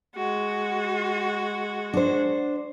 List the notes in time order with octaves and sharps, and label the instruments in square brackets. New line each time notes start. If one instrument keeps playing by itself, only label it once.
[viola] G#3 F#4
[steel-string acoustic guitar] D4 C5